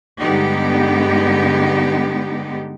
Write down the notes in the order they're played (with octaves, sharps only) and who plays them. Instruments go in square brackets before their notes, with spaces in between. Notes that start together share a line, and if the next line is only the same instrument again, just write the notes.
[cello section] G2 D3 G#3 B3 D#4 G4